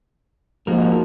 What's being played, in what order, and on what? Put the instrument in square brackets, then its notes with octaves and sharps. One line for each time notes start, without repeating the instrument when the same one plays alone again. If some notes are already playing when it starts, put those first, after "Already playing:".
[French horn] G#2 [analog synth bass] F3 [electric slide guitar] A#3 F#4 A#4